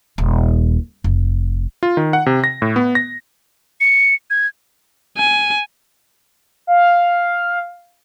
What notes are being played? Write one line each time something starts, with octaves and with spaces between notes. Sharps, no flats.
D#1
F1
F4
D#3
F#5
C3
A#6
A2
B3
A#6
C#7
G#6
G#5
F5